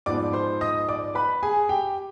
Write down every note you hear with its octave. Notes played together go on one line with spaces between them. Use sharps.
G#2 F3 B3 D5 D6
C5 C6
D#5 D#6
D5 D6
B4 B5
G#4 G#5
G4 G5